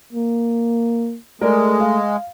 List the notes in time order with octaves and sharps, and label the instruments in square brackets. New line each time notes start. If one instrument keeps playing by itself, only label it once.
[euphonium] A#3
[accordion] G#3 [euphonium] A3 [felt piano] A#4 D5
[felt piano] F5